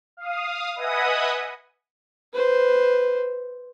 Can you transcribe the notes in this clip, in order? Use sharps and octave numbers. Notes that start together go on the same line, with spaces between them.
F5 D#6
B4 D#5 E5 F#5 G#5 D#6
B4 C5